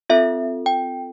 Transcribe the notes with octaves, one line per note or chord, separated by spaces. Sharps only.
C4 F4 A4 E5
G5